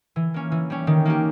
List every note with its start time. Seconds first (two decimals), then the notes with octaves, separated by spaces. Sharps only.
0.16 E3
0.34 A#3 C#4
0.52 E3
0.70 G3 C#4
0.87 D#3
1.05 A#3 C#4 G4